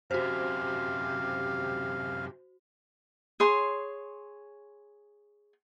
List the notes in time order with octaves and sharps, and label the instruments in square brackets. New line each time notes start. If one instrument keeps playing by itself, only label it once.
[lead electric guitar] F#2 C3 [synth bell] F#4 C5 [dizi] G4 [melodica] F5
[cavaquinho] G#4 C#5 C6